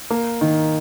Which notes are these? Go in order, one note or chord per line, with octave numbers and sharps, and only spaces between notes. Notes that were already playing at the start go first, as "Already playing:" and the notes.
A#3
D#3